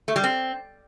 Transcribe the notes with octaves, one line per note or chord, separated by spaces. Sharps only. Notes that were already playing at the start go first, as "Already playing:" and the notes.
A3
G3
C4